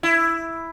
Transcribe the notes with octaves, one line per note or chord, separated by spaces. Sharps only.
E4